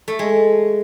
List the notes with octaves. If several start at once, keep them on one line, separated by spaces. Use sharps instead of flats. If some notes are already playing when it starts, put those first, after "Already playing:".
A3
G#3